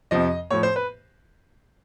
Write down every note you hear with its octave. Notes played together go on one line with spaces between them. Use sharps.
F2 C3 F3 D#5
A2 F3 C#5
C5
B4